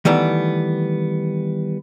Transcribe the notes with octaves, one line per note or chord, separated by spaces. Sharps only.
D#3 E3 G3 A3 B3